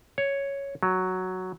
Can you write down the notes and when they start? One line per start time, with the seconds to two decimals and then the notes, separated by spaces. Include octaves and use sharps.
0.18 C#5
0.83 F#3